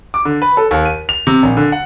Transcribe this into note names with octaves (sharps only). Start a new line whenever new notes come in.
D6
D3
B4
A4
D#2
D#7
F7
C3
A#1
D3
F#5